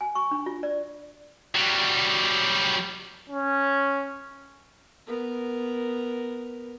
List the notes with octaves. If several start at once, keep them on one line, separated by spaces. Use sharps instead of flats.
G#5
C#6
D4
F4
D5
F#3 G3
C#4
B3 A#4